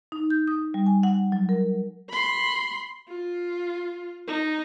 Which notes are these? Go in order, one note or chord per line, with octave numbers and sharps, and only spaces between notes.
D#4
G6
D#6
G3
G#5
F#5
F#3
A#4
B5 C6
F4
D#4